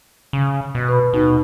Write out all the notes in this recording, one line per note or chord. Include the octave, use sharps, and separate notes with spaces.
C#3
B2
B4 B5
D#2 B2 D#4